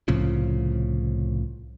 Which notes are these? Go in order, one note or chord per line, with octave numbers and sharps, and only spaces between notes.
C2 A2 C#3 F3